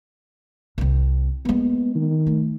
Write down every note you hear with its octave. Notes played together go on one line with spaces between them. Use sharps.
C2 C4
G#3 A#3 B3
D#3
A3